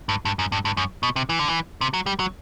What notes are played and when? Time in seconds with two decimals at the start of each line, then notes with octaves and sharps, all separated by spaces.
0.09 G2
0.25 G2
0.39 F#2
0.52 G2
0.65 G2
0.77 F#2
1.03 B2
1.16 C3
1.29 E3
1.39 D3
1.48 E3
1.81 C3
1.94 F#3
2.06 G3
2.20 F#3